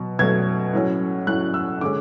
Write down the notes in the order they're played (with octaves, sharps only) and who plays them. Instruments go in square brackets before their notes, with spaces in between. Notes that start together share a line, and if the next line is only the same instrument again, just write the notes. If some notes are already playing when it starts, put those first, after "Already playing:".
Already playing: [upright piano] B2 F#3
B2 F#3 A3 G#6
A2 F#3 C#4
A2 F#3 C#4 F#6
E6
D3 G#3 C#4 D6